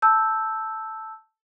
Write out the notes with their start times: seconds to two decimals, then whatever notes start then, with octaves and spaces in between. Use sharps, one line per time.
0.02 A5 E6 G6